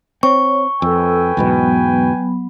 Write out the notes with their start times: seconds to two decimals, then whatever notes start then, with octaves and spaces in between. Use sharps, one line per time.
0.23 C4 C#5 C#6
0.82 F2 A4 B4 G5 G#5 E6
1.37 E2 G#2 B2 F#3 B3 B5